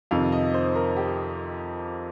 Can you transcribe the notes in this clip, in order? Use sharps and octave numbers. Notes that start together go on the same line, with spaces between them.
F2 C3 D#3 F5
D#5
C5
A#4
G4